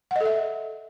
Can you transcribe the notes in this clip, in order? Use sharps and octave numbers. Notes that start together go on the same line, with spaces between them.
A4 D#5 E5 F#5